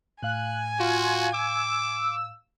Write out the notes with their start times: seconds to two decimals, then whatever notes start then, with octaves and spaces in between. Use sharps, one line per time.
0.23 A2 F5 G#5 F#6
0.80 F4 F#4
1.34 D6 E6